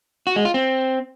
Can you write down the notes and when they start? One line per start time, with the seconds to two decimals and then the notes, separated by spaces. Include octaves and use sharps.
0.27 F#4
0.36 G#3
0.45 F4
0.54 C4